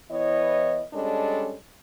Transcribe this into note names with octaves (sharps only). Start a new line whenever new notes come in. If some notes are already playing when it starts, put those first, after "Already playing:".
E3 B3 E4 C#5 D#5
G3 G#3 C#4 D4 A4 D#5